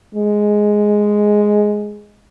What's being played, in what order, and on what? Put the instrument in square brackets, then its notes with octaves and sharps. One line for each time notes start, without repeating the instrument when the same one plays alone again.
[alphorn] G#3